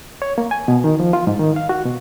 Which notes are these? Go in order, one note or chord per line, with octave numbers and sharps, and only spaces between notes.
C#5
A#3
G#5
B2
D#3
F3
F4
G#2
D#3
F5
F#4
B2